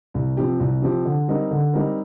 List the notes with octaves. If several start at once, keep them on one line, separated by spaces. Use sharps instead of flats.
C2
C3 F3 C4 G4
C2
C3 F3 C4 G4
D3
G3 C4 D#4 A#4
D3
G3 C4 D#4 A#4